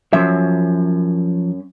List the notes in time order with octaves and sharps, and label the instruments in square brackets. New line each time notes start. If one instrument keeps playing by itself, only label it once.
[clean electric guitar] F#2 [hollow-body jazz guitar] F3 E5